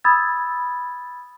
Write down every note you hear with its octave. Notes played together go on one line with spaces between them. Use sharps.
B5 D#6 E6 G#6 A6